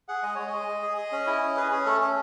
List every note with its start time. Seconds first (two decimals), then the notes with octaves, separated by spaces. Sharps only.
0.09 G#4 F#5
0.23 G#3 D#5
0.35 G#3 C#5
0.47 D#5
0.53 G#3
0.68 G#3
0.82 G#4
0.97 G#4
1.12 C#4
1.27 E4
1.42 C#4
1.57 G#4 B4
1.72 C#4 G#4
1.86 A3 A4
2.01 C#4 A4